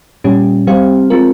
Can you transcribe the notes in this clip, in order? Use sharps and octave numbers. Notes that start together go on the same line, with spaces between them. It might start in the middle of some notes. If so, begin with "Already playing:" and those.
A#2 G3 C#4 G4
G3 C4 G4 C5 F5
G#3 C4 F4 A#4